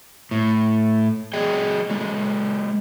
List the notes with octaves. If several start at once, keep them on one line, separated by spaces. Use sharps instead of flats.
A2
F#3 G#4 D#5 G5
F#3 G#3 A4